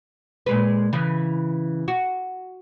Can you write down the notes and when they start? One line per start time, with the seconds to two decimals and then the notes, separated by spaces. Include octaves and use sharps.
0.46 A#2 G#3 B4
0.93 C#3 E3
1.88 F#4